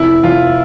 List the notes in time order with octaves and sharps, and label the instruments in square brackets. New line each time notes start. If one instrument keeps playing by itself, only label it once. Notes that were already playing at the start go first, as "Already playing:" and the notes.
Already playing: [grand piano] F1 E4
F1 F4